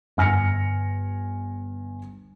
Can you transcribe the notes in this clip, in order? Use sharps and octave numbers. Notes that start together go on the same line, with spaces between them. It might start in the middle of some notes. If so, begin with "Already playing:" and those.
G1 G#5 F6 A#6 C#7